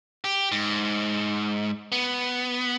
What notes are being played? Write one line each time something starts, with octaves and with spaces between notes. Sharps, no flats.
G4
G#2
B3